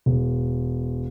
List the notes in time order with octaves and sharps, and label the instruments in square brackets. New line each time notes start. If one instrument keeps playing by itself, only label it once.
[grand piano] E1